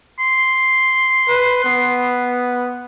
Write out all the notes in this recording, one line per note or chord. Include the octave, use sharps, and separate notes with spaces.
C6
B4
B3